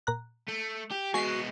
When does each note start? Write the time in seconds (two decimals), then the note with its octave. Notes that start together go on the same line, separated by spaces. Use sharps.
0.07 A#2 A#5 F#6
0.48 A3
0.91 G4
1.14 G#3 B3 F#4 G#5 B6 C7